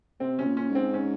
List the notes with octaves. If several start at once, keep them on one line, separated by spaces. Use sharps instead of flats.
C3 C4
C3 C#4
A#2
C#4
G#2
C4
C#4